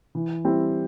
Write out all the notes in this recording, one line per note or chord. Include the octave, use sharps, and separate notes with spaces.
E3
G3 C4 E4